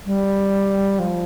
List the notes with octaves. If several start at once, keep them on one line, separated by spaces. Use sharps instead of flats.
G3
F3